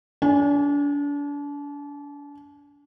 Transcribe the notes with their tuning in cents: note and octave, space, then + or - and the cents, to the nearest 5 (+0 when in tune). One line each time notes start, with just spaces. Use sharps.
D4 -35 G#5 +0